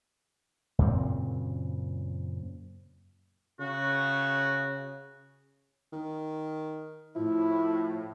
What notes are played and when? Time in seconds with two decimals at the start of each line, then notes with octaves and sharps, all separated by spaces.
0.79 F#2 A#2 C#3 C4
3.60 C#3 F#4
5.92 D#3
7.16 A2 F3 E4